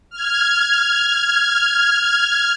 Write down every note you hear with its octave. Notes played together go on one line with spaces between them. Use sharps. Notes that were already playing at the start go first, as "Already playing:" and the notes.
F6 G#6